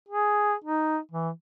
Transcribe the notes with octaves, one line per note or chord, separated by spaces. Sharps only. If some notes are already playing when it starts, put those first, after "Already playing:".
G#4
D#4
E3